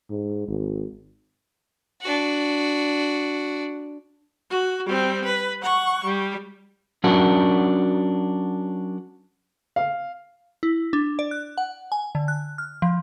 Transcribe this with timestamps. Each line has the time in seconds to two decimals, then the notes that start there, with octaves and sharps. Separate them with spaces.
0.10 G#2
0.48 G#1
2.01 D4 F#4
4.50 F#4
4.86 G3 C4
5.25 B4
5.63 F#5 C#6
6.04 G3
7.04 F#3 C#4 D4 F#4 A#4
9.76 F5
10.63 E4
10.93 D4
11.19 D5
11.31 F#6
11.58 F#5
11.92 G#5
12.15 D3
12.28 F#6
12.58 F6
12.82 F3